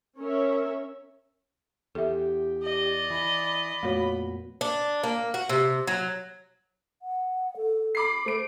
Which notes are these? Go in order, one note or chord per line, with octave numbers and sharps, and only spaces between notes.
C#4 A#4 C#5 E5
E2 G4 A4 E5
D5 D#5
E3 B5
F2 A#2 A3 B3 F#4 C#5
D4
A#3
F#4
C3
F#3
F#5
A4
B5 D6 C7
A3 C5 D7